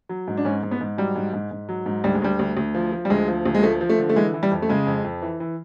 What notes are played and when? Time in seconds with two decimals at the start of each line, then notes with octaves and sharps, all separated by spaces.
0.09 F#3
0.28 G#2
0.37 D4
0.45 G#2 C#4
0.63 G#2
0.71 B3
0.81 G#2
0.98 F#3 G3
1.16 G#2
1.33 G#2
1.51 G#2
1.69 F#3
1.86 G#2
2.04 D2 G3
2.14 G#3
2.22 D2 G3
2.39 D2
2.57 D2
2.75 F3
2.92 F3
3.05 G3
3.10 D2 G#3
3.28 F3
3.45 D2
3.55 G#3
3.63 F3 A3
3.81 F3
3.89 A3
3.99 D3
4.09 A3
4.16 E3 G#3
4.34 E3
4.43 G3
4.51 F2
4.62 A3
4.69 C#3 G#3
4.87 F2
5.04 F2
5.22 E3
5.40 E3